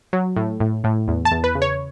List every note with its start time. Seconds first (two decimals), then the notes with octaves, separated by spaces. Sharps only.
0.13 F#3
0.36 A2
0.60 A2
0.84 A2
1.08 E2
1.25 A5
1.31 E2
1.44 B4
1.55 C#3
1.62 C#5